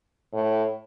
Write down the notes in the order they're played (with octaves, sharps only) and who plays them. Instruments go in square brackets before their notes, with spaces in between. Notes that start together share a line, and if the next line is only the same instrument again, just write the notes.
[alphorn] A2